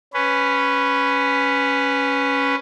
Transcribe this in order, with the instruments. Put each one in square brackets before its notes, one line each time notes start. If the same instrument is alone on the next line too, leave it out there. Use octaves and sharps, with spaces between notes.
[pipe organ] C#4 B4